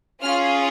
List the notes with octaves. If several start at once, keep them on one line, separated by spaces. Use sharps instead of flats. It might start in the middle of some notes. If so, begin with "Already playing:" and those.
C#4 F4 G#4 F6